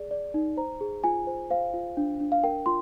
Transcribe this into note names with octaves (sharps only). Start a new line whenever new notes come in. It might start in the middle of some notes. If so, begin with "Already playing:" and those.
Already playing: G#4 D5
D5
D#4
C5 A#5
G#4
F4 G#5
C5
C5 F5
F4
D4
D4
F5
A#4 G5
F4 C6